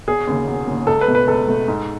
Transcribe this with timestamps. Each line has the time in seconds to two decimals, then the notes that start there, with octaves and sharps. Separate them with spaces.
0.08 E1 G#4
0.27 D#2 C#3
0.47 E1
0.67 D#2 C#3
0.87 C#2 A4
1.01 B4
1.08 B2 A3
1.15 B4
1.27 C#2 A4
1.48 B2 A3
1.68 G#2